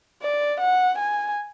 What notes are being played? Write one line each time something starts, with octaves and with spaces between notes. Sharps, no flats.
D5
F#5
G#5